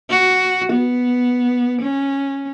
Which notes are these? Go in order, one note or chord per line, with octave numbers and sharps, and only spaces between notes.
F#4
B3
C#4